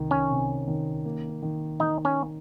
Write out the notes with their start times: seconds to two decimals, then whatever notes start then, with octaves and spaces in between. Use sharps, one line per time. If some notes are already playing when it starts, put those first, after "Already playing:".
Already playing: C2 D#3
0.11 C#4
0.30 C3
0.68 D#3
1.05 A#3
1.42 D#3
1.80 D#3 D#4
2.05 C#4